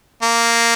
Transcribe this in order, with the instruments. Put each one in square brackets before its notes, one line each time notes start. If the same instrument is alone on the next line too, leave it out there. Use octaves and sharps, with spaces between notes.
[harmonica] A#3